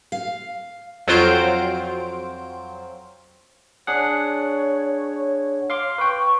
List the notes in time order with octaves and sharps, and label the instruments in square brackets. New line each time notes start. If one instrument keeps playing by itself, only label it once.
[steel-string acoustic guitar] F5
[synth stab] F2 F#3 C4 F4 C5 D7
[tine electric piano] D4 G#4 F#5 [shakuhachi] C#5
[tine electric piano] F5 C6 D6
[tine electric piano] B4 G5 [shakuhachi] C#6